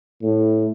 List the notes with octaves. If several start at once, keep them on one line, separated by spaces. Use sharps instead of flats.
A2